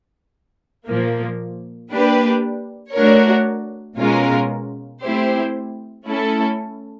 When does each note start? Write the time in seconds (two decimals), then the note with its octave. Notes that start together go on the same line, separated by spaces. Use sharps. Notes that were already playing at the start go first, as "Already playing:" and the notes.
0.87 A#2 F3 A#3
1.91 A#3 D4 G4 B4
2.94 A3 D4 F#4 A#4 C#5
3.97 B2 G#3 C#4 F4 A#4
5.02 A3 C4 E4 G4 C5
6.05 A3 C#4 E4 A4